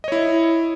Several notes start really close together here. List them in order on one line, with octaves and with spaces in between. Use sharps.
D#5 C#5 E4